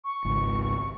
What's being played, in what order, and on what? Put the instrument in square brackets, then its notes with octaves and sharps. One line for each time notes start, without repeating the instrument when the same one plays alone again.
[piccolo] C#6
[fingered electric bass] G#1 C#2